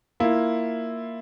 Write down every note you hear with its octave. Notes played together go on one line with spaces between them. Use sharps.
A#3 E4 F4